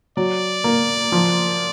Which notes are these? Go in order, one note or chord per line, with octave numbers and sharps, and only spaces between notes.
F#3 D5
A#3
F3